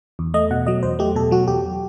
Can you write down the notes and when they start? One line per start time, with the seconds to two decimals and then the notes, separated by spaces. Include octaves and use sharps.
0.19 E2
0.34 A3 D#5
0.51 B2 F#5
0.67 F#3 D#5
0.83 E2 C5
0.99 A3 G4
1.15 B2 A4
1.31 F#3 F#4
1.48 E2 G4